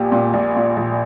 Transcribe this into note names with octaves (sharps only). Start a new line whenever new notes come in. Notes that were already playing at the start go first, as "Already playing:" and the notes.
Already playing: A#1 A#2 G4
A#2
A#1
A#2
A#1